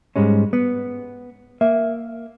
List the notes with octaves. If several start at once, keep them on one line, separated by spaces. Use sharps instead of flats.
G#2 G3 G#3 C#4
B3
A#3 E5